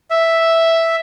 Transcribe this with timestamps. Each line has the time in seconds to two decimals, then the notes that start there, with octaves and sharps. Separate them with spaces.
0.10 E5